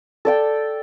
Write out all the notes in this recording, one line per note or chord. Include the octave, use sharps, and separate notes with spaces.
A4 D5 G5